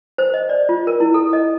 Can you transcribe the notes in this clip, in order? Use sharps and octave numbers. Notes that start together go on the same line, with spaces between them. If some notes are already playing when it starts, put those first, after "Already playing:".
C5
D#5
D5
F4
A#4
E4
A4
D#5